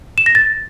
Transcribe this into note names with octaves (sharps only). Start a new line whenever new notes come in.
E7
A#6
A6